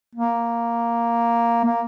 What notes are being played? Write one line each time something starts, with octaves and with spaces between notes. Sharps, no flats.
A#3
A#3